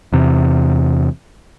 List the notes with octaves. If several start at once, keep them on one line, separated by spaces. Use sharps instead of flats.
E2 C3